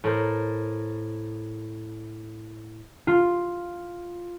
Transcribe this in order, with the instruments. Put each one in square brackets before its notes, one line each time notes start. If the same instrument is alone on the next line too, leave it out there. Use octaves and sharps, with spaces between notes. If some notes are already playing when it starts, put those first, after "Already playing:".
[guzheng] A2 A#4 C5
[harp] F4